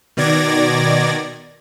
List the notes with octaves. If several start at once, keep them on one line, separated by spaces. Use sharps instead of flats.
B2 D#3 D5 G#6 A#6